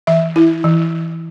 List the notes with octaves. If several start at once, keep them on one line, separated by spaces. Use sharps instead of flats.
E3 E5
E4
E3